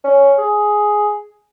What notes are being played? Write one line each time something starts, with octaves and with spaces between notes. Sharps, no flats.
C#4
G#4